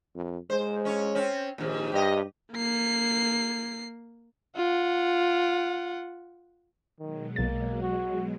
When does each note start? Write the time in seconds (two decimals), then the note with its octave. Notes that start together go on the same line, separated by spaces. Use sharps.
0.15 F2
0.50 G#3 C5
0.85 C#4 C#5
1.15 C4 C#4
1.58 A#1 D#2 G#2
1.92 G2 G4 D#5
2.53 A#3 C7
4.57 F4 F#5
6.99 B2 D#3 F#3 G#3
7.36 B1 A#3 A6
7.82 F#4